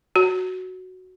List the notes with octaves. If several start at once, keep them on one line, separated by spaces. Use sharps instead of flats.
F#4